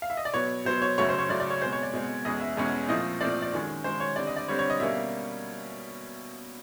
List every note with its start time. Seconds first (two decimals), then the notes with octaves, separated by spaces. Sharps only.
0.02 F5
0.10 E5
0.17 D#5
0.25 D5
0.34 B2 F#3 B3 C#5
0.65 B2 F#3 B3 C5
0.82 C#5
0.98 F#2 C#3 F#3 A3 C#5
1.09 C5
1.18 C#5
1.29 F#2 C#3 F#3 A3 D5
1.40 D5
1.50 C#5
1.62 B2 G#3 C4 C5
1.73 C#5
1.83 D5
1.93 B2 G#3 C4
2.25 E2 B2 G#3 C#4 D#5
2.41 E5
2.57 E2 B2 G#3 C#4
2.88 A#2 F3 A3 C4 D#5
3.21 A#2 F3 A3 C4 D5
3.42 D5
3.53 F#2 D#3 G#3 C#4
3.84 F#2 D#3 G#3 C#4 C5
4.00 C#5
4.16 D3 G3 C4 D5
4.27 D#5
4.36 D5
4.48 D3 G3 C4 C#5
4.59 C#5
4.70 D#5
4.80 B2 G3 A#3 C#4 E5